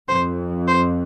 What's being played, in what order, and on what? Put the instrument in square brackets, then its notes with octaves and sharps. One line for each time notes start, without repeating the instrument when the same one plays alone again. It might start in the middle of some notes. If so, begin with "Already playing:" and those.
[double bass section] F2 [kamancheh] C5
[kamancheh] C5